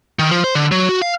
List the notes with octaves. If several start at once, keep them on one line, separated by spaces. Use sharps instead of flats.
D#3
F3
C5
D3
F#3
F#4
F5